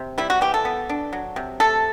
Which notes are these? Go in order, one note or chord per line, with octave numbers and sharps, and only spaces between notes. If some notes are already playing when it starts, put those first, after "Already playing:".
Already playing: C3 C4
G3 E4
F#4
E3 G4
A4
B3
D4
F#3
C3
A3 A4